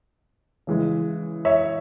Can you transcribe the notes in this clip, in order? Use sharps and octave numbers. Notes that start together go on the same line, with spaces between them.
C#3 E3 G#3
C#5 E5